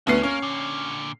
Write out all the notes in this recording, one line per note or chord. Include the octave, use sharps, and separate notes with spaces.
D2 B3 C#4 C7
A#3 C#4
A#2 D3